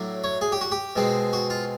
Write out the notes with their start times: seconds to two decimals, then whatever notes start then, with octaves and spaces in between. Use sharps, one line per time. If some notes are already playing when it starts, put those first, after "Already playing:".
Already playing: A2 F#3 A3 D4
0.24 C#5
0.41 G#4
0.52 G4
0.61 F#4
0.72 G4
0.96 B2 G#3 C4
1.33 F#4
1.50 F4